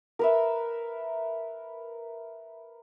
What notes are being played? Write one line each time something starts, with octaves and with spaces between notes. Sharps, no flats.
A#4 B4 E5